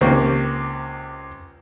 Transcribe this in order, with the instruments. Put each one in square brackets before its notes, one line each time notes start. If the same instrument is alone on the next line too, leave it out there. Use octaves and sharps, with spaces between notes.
[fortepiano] C#2 A#3 C4 G4 C#6